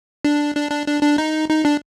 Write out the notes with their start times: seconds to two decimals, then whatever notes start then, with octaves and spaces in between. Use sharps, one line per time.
0.25 D4
0.56 D4
0.71 D4
0.87 D4
1.02 D4
1.18 D#4
1.49 D#4
1.65 D4